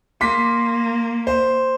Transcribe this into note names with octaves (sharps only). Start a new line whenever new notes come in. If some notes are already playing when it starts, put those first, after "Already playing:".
A#3 C6 D6 B6
C5